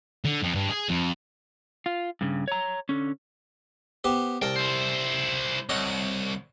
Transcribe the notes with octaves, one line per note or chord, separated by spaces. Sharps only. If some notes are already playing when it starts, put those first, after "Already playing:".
D3
F2
G2
G#4
F2
F4
G2 C#3
C#5 A#5
D3 C#4
B3 G4 C5
C2 A#4 G5 A5
E4 C5
C2 C#5 D#5 F#5